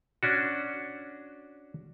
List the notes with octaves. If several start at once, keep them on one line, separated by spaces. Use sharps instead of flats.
C#4 D4 F#4